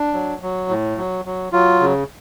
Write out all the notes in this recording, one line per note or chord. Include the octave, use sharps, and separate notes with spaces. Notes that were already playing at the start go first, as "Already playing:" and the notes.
Already playing: D4
F#3
F#3
A2
F#3
F#3
F#3 F4
C#3